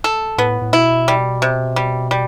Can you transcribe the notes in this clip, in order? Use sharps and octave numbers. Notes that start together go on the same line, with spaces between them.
A4
A2 B3
A2
B2 E4
G3
C3
G3
G3